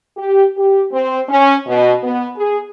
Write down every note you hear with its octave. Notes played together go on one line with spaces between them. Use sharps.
G4
G4
C4
C#4
B2
B3
G#4